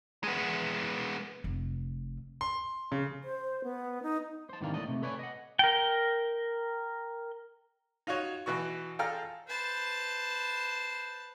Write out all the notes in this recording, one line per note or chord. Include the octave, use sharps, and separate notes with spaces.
G#3 B3
F1
C6
C#3
C5
B3
D#4
C5 A5
G#2 C3 D#3 E3 D4 F5
D#2 A2 D3 D5 D#5
C3 A3
A4 B4 C#5 D5 G5 G#5
D#5 F#5
A#4 G5
D#4 F4 F#4 C#5
B2 E3 F#4 C#6
F4 G#4 A4 G5 A#5 F6
B4 C5 A5